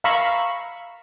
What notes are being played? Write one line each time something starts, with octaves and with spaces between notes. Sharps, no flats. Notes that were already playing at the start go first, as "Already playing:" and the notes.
F5 A#5 B5 C#6 E6